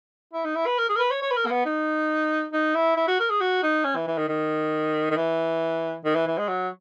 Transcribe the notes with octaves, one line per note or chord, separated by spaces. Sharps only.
E4
D#4
E4
B4
A#4
G#4
A#4
B4
C#5
C#5
B4
A#4
A#3
B3
D#4
D#4
E4
E4
F#4
A#4
G#4
F#4
D#4
C#4
E3
E3
D#3
D#3
D#3
E3
D#3
E3
E3
G#3
F#3